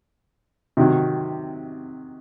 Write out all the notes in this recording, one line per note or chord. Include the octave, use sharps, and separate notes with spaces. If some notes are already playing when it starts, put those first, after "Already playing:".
C3 D#3 F#3